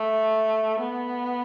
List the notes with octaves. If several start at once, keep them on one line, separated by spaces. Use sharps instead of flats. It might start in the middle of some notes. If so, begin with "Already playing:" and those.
Already playing: A3
B3